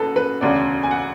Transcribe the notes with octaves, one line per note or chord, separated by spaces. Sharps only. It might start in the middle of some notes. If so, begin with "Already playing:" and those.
Already playing: F#1 F#2 A4 B4
B4
E1 D2 C#3 D5
G#5
F#5